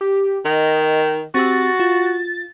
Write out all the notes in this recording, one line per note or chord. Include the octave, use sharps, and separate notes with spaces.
G4
D#3 D#5
C4 F#4 G4 E6 A6
F4